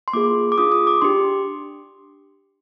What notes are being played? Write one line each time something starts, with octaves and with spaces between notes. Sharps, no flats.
C6
A#3 F4 G#4 D6
D6
D4 F4 G#4 D#6
D#6
D6
D4 G4 C6